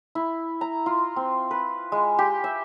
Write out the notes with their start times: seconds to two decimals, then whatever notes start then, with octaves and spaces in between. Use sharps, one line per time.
0.15 E4
0.61 A#5
0.86 F4
1.16 C4
1.51 B4
1.92 G#3
2.19 G4
2.44 E5